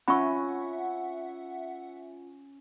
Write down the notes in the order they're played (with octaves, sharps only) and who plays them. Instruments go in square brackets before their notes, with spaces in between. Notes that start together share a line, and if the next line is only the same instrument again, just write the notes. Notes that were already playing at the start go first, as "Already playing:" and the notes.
[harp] C#4 [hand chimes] F4 [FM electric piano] E5 F#5 [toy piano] B5 C#6